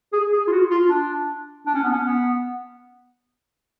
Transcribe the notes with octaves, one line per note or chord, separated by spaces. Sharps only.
G#4
G#4
F4
F#4
F4
D4
D4
C#4
B3
C#4
B3